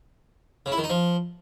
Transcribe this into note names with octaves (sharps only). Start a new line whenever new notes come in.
C#3
E4
D#3
D#4
F3